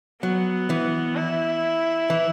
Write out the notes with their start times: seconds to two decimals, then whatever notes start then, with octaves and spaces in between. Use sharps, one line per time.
0.22 F#3 B3
0.70 E3
1.16 E4
2.10 E3